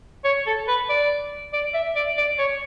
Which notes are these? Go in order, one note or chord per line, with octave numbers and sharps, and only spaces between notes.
C#5
A4
B4
D5
D5
E5
D5
D5
C#5